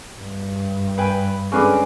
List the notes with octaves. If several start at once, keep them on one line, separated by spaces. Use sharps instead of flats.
G2
B4 G5 G#5
D3 G#3 C4 C#4 B4 D5